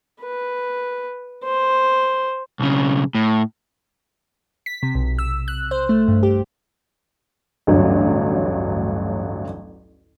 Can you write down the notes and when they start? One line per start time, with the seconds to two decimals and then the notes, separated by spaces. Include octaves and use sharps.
0.22 B4
1.44 C5
2.60 B1 C#3
3.15 A2
4.66 B6
4.83 C3
4.95 B1
5.19 E6
5.48 F#6
5.71 C5
5.89 A3
6.08 G2
6.23 G4
7.67 A1 D2 G2 F#3